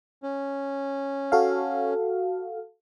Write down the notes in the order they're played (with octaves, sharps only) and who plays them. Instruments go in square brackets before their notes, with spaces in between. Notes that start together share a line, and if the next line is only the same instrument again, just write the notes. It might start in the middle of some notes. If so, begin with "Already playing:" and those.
[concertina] C#4
[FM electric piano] F#4 A4 F5